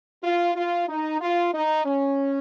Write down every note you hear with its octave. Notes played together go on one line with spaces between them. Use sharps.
F4
F4
D#4
F4
D#4
C#4